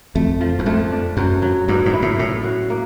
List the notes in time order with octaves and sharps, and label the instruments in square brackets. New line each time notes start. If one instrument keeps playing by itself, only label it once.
[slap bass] F2 [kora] A3
[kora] F3
[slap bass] E2
[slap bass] F2 [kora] A3
[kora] D4
[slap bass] F#2 [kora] F#3
[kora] F#3
[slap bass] G2 [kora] F#3
[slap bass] G#2
[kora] E4
[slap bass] A2
[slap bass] A2 [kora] C#4
[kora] F#4
A#3